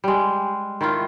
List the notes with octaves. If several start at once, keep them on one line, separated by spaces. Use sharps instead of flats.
G3 G#3
D#3 E4 F4